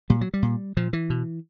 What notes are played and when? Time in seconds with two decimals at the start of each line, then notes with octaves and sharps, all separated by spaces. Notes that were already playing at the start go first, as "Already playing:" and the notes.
0.10 A#2 G3
0.21 F#3
0.34 G3
0.43 A#2
0.77 A#2 F3
0.93 E3
1.10 B2